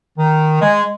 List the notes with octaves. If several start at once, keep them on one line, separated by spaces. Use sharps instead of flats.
D#3
G#3